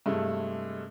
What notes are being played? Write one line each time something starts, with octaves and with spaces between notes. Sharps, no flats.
G2 C3 G#3 A3 E4